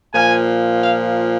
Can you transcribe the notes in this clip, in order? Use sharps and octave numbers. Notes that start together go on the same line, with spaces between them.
A#2 F3 G#5
F5